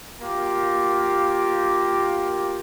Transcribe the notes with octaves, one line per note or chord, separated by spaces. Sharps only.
A#3 F4 G4